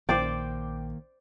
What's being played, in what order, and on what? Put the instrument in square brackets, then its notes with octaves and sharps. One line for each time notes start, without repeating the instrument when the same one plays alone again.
[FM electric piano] A#1 [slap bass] D#3 A#3 [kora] C5 D5 [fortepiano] G5 D6